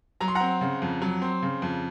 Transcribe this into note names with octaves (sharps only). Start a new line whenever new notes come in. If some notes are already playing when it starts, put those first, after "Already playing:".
F#3 A#5
C6
C4 F#5 A#5
C#3
F2
F#3
C4
C#3
F2